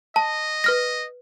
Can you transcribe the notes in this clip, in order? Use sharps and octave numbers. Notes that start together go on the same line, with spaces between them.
D#5 A5
B4 F6 A#6